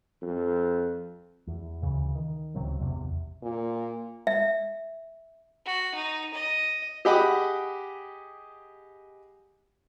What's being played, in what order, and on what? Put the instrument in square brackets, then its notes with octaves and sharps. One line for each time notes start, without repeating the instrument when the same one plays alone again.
[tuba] F2
[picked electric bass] E2
D2 C#3 E3
D#3
D1 C#2 C3 F#3
A1 E2 C3
[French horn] A#2
[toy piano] E5
[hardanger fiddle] F#4
D#4
D#5
[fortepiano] G4 G#4 D#5 F#5 B5 D6